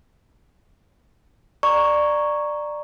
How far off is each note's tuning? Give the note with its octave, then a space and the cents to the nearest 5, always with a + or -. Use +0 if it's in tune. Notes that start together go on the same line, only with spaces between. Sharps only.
D5 +15 A#5 +0 C#6 +0